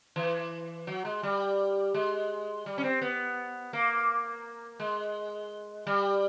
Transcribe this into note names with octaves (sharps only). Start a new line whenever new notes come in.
E3
F#3
G#3
G3
G#3
G3
C#4
C4
B3
A#3
G#3
G3